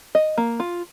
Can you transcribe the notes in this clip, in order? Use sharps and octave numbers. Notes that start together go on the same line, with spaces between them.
D#5
A#3
F4